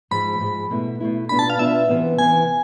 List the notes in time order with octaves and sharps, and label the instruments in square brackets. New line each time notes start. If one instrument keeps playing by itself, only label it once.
[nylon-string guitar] G#2 F3 G#3 [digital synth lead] B5
[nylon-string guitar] G#2 F3 G#3
B2 A3 E4
B2 A3 E4
[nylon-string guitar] B2 B3 D4 F4 [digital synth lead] B5
[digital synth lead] A5
F5
[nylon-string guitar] B2 B3 D4 F4 [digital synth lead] E5
[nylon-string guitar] C3 E3 B3
[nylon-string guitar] C3 E3 B3 [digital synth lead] G#5